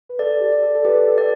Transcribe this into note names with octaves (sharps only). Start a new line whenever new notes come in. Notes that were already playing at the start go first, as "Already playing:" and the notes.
B4
A4 D5
G4
D5
A4
A4
G4 B4
A4
D5